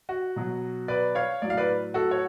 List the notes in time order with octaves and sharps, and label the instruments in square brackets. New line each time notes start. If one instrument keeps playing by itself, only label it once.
[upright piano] F#4
B2 F#3
B4 D5
C#5 F5
A2 F#3 D5
F5
B4 D5
F#4 A4
C#5